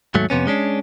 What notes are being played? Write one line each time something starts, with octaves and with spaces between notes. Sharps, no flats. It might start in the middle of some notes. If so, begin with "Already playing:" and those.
D#2 G#2 F#3 A3
F2 C3 B3 C#4
G#3 C#4 D4